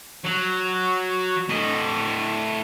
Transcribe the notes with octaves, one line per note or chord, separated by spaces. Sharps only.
F#3
A2 D#5